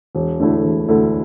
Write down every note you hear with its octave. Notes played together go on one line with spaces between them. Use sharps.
E1
D2 D3 A3 E4
E1
D2 D3 A3 E4